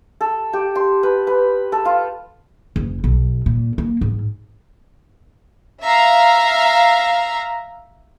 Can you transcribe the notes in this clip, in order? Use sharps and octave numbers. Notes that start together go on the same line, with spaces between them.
A4
G4
C6
B4
B4
A4
F4
F#1
B1
A#2
A#3
G#2
E5 F5 A#5